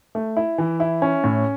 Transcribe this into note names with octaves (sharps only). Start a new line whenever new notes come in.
A3
E4
E3
E4
C#4
A2